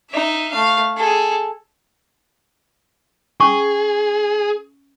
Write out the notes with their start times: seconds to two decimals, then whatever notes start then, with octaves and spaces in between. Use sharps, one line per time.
0.10 D#4 E5
0.51 A3 F5
0.97 G#4 A4
3.40 C#4 G#4 C#6